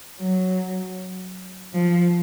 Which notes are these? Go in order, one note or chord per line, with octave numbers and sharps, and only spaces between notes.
F#3
F3